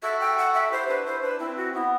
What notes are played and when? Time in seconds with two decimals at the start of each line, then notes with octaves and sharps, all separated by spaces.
0.03 F#4 A4 E5
0.20 G5
0.38 F#5
0.54 E5
0.71 E4 G4 C5
0.89 D4 F#4 B4
1.05 E4 C5
1.22 D4 B4
1.39 C4 E4
1.57 F#4
1.74 B3 E4